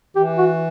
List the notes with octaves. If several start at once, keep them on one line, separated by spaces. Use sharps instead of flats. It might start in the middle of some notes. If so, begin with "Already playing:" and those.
E3 G4
F#4